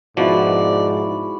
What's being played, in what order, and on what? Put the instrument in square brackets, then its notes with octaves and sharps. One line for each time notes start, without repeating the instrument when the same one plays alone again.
[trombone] G#2 [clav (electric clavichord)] B2 F3 [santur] E4 F#4 [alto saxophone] D5